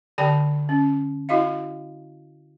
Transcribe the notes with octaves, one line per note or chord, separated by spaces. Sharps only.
D3 G4 D5 G5 A5
C#4
E4 F#4 D#5 F5